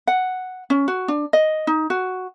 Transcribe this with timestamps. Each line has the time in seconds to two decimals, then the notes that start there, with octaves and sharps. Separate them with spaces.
0.07 F#5
0.70 C#4
0.88 F#4
1.08 D4
1.33 D#5
1.67 D#4
1.90 F#4